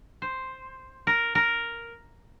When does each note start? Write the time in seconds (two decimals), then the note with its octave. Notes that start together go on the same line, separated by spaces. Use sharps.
0.22 C5
1.07 A#4
1.35 A#4